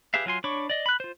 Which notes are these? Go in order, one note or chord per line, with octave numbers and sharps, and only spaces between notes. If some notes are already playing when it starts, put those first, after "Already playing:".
G4 G#4 B4 E5 F5
F#3 F4 G#5 C6
D4 C#5 B5 C#6 D6
D5 D#5
B5 F#6
F4 C5